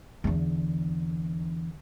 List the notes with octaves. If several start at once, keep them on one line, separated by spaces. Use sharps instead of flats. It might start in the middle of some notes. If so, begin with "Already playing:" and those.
E2 D3